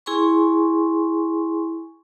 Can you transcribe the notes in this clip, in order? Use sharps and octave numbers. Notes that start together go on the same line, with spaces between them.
E4 G#4 G#5 C6 C#6